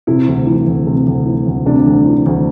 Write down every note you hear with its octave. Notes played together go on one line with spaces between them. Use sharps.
C3 E4
D2
E3
D2
C3
D2
E3
D2
C3 D4
D2
E3
D2